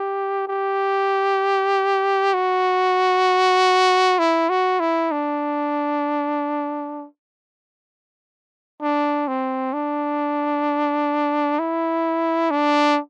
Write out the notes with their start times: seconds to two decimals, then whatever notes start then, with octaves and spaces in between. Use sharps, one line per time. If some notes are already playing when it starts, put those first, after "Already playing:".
Already playing: G4
0.48 G4
2.34 F#4
4.19 E4
4.49 F#4
4.80 E4
5.12 D4
8.82 D4
9.28 C4
9.73 D4
11.59 E4
12.51 D4